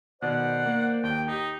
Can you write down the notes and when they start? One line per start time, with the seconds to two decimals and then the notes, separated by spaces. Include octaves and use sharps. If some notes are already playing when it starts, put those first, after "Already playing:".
0.22 B2 D#3 C5 D5 F#5
0.65 A#3
1.03 D#2 G5
1.28 D#4 G4